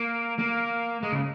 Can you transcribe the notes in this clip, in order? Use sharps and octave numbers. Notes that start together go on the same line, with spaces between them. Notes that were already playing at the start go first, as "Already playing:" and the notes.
Already playing: A#3
A#3
G#3
C#3